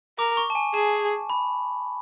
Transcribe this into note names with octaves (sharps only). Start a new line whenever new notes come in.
A#4 D6
C#6
A5
G#5
G#4 A5
B5